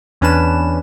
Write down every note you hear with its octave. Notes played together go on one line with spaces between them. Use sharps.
E2 C#4 D4 B4 E7